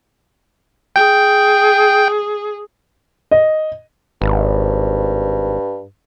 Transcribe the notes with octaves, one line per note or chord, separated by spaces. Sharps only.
G#4 G5
D#5
G#1 G2